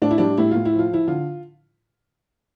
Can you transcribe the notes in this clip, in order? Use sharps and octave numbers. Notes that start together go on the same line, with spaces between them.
A2 D4
E4
G3 D4
A2 E4
A2 F4
E4
F3
F4
F3 E4
D3 F4